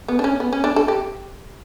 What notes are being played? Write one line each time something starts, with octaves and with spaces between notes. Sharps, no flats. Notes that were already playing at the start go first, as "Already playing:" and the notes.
B3
D4
C#4
B3
C#4
D4
A4
G4